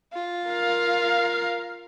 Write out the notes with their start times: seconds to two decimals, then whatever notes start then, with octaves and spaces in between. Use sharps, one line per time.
0.13 F4
0.49 A#4 F5